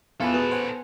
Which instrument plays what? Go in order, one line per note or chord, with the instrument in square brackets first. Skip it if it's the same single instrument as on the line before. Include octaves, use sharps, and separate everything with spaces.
[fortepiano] E2 [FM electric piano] F4 G#5 B5 [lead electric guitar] A4 B4
[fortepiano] B3 [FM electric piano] F#4 G#4
[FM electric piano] C5 F#5 G#5